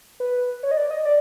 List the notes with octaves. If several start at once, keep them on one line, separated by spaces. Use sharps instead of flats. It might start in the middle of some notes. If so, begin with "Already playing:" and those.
B4
C#5
D#5
D5
D#5
D5